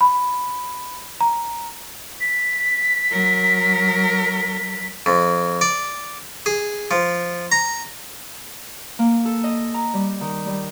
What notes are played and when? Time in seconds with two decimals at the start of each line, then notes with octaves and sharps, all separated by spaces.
0.01 B5
1.21 A#5
2.21 B6
3.11 F#3 A#4
5.06 F2
5.61 D5
6.46 G#4
6.91 F3
7.52 A#5
8.99 A#3
9.25 A4
9.44 D#5
9.74 A#5
9.94 G3
10.21 D#3
10.47 G3